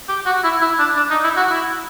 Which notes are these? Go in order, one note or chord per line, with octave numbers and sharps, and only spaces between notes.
G4
F#4
E4
E4
D4
D4
D#4
E4
F#4
E4